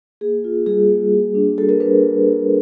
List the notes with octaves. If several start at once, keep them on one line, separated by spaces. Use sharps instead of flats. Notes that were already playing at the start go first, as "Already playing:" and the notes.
A#3 G#4
F4
G3 G#4
A#3
F#4
D4
F#4 A4
A#4
D4 B4